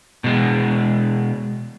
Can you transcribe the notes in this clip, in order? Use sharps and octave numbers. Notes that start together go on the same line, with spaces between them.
B2 G#3